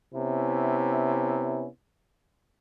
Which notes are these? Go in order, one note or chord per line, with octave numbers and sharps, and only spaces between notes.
C3 B3 C#4 E4